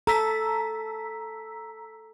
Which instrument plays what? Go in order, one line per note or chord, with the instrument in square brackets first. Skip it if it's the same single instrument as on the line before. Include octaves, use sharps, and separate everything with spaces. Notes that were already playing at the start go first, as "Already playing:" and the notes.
[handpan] A4 [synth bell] A#5 E6 B6